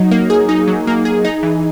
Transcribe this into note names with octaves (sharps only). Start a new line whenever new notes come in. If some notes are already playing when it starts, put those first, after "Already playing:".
Already playing: F#3 D#4
A#3
G#4
D#4
F#3
A#3
G#4
D#4
E3